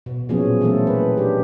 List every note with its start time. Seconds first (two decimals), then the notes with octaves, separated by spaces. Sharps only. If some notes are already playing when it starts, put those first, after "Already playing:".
0.06 B2
0.29 A#2 F3 F#3 B3 C#4 G#4
0.61 E3 A3 A#3 C4 C#4 A4
0.87 B4
1.17 D4 G4